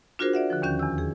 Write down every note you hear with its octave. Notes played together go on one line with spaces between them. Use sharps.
D4 F4 F#4 G#4 A#4 C5
D5 E5 F#5
D3 F3
D#2 D#3 C#4 G6
E2 E6
G#4